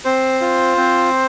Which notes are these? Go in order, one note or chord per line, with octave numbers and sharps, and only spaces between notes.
C4 C5
F4
C4